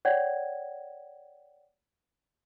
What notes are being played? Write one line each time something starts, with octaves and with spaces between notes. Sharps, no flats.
C#5 D5 F#5 G5 G#6